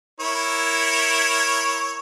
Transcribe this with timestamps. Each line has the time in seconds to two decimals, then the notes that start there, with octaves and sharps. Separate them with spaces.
0.20 E4 A#4 C#5